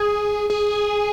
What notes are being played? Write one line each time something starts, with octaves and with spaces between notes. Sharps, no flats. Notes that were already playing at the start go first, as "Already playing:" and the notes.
Already playing: G#4
G#4